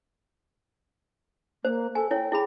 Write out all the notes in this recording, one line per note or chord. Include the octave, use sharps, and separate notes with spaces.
A#3 C5
A4 G#5
E4 C#5 G5
E4 G#4 B5